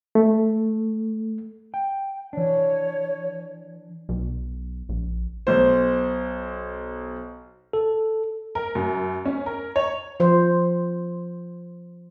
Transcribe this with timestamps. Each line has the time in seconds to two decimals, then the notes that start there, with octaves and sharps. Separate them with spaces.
0.15 A3
1.74 G5
2.33 E3 D4 C#5
4.09 B1
4.89 A#1
5.47 B1 C5
7.73 A4
8.55 A#4
8.75 F#2
9.26 C#4
9.46 A#4
9.76 C#5
10.20 F3 C5